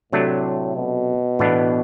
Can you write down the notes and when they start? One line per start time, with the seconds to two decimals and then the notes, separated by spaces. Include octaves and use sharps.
0.12 A2 C3 F#3 A3 D4
0.76 B2
1.39 A2 E3 B3 D4